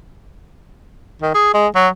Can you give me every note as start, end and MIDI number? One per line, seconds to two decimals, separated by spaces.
1.22 1.33 51
1.34 1.50 68
1.54 1.67 56
1.75 1.88 54